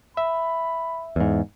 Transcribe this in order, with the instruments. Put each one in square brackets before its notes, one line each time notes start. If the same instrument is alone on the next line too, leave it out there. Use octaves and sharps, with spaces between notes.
[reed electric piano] E5 [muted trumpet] B5
[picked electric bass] E2 G#2